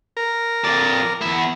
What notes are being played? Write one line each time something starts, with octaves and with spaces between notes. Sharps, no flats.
A#4
F2 D5
E2 E4